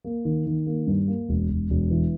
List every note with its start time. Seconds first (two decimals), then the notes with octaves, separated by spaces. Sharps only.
0.04 A#3
0.25 D#3
0.46 D#3
0.67 A#3
0.87 G2
1.08 A#3
1.29 E1
1.50 E1
1.70 E1
1.91 E3